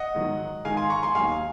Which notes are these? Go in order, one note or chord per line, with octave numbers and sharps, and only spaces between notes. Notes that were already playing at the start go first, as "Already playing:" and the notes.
Already playing: D#5 F#5
G#2 D#3 F#3
G#2 D#3 G#3 F5 G#5
G#5 C6
A#5 C#6
G#5 C6
D#2 D#3 F#3 F5 G#5